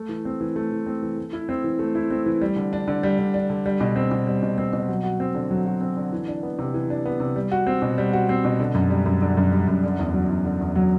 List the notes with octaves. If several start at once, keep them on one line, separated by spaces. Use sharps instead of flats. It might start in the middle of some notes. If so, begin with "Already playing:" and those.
Already playing: A3
E3
C4
E3
A3
E3
C4
E3
A3
E4
C4
E3
A3
E4
C4
E3
G3
D3
D4
D3
G3
D3
D4
D3
G3
B2
C4
B2
G3
B2
C4
B2
F#3
F#4
C4
D3
F#3
F#4
C4
D3
E3
D4
B3
C3
E3
D4
B3
C3
G3
F#4
C4
B2
G3
F#4
C4
B2
D3
F#2
G3
F#2
D3
F#2
G3
F#2
D3
E2
F#3
E2
D3
E2
F#3